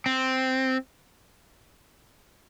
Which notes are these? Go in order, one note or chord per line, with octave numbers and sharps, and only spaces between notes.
C4